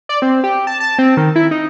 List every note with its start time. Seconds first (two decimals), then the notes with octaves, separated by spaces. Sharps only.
0.09 D5
0.22 C4
0.44 G4
0.67 A5
0.80 A5
0.99 C4
1.17 D#3
1.36 E4
1.51 D#4